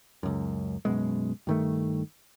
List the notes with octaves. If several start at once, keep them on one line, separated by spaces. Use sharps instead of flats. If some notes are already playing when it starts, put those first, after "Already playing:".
C#2 F#2
F#2 B2 G#3
G2 D#3 A3